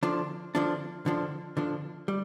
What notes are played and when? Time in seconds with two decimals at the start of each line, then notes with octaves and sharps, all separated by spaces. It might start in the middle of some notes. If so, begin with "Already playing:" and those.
0.03 D3 F3 D4
0.55 D3 F3 D4
1.06 D3 F3 D4
1.57 D3 F3 D4
2.08 G3